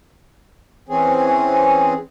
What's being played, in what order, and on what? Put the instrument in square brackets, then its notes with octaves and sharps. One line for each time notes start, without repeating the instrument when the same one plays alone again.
[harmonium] E3 C4 C#4 G#4